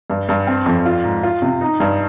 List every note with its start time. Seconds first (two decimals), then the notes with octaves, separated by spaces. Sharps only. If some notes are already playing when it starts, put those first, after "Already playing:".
0.10 G2
0.29 G2
0.47 C4
0.66 F2
0.85 F4
1.04 G#2
1.23 F4
1.42 C3
1.61 D#4
1.80 G2